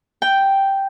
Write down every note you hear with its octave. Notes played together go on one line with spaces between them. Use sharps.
G5